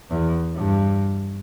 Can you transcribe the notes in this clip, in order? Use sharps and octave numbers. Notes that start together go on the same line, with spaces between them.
E2
G2